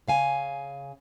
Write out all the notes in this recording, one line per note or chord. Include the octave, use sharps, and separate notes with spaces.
C#3 F5 G#5